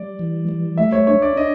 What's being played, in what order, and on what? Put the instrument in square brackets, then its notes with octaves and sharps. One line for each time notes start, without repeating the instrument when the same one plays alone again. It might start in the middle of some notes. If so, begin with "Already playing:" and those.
Already playing: [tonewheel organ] G3 [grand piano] D5
[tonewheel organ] E3
G3
[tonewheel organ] A3 [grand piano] E5
[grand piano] C#5
[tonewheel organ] D4 [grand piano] C#5
[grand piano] D5
[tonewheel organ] D4 [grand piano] D#5